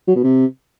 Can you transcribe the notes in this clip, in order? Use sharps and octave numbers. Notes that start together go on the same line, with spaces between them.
F#3
B2
C3